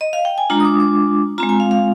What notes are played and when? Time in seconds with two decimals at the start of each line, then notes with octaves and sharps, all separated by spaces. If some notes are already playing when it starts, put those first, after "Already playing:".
0.01 D#5
0.13 F5
0.25 G5
0.38 G#5
0.50 G#3 D4 F4 A#5
0.60 D#6
0.65 D6
0.80 D6
1.38 G#3 C4 F4 A#5
1.49 G#5
1.60 F5
1.71 F5